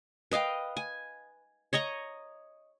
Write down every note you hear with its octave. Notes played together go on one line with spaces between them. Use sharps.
B4 D#5 F5 G5
G#5
C#5 D#5 A#5 C#6